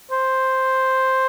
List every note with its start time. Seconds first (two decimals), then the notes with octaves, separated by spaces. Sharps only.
0.11 C5